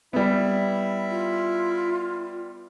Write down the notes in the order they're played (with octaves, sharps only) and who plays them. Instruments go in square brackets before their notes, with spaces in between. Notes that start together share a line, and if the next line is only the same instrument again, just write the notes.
[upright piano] G3 B3 [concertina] E4 E5
[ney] F4